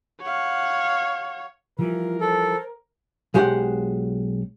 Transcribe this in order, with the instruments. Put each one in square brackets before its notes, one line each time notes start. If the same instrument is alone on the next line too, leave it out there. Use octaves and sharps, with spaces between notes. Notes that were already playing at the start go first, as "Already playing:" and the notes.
[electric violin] C#5 [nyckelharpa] F5 F#5
[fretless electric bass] E3 F3 G3 [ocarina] F4 [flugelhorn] A#4
[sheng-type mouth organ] A4 [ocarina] C5
[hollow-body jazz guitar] B1 G#3 G4 C5 D#5 F#5